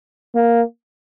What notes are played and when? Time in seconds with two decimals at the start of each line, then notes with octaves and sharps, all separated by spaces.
0.35 A#3